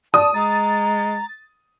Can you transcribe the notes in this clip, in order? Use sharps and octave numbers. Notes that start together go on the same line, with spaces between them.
D5 A5 D#6
G#3 A#5 A6